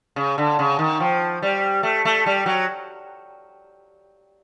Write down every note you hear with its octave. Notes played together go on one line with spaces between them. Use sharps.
C#3
D3
C#3
D#3
F3
G3
A3
A3
G3
F#3